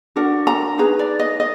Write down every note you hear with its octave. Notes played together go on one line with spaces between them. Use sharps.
D4 F#4 A#4 F#5
A#5
D#4 G#4 B4 A#5
D5
D#5
D#5